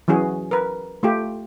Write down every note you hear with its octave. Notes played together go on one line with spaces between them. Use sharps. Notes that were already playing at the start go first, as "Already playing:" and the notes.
E3 F#3 C#4 F#4 G#4
A#4 B4
A3 F4 G4